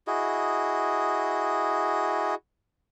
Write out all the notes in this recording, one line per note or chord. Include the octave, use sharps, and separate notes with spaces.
E4 F#4 G#4 D#5